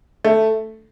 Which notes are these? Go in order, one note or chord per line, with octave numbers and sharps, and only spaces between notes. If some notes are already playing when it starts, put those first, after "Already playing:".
A3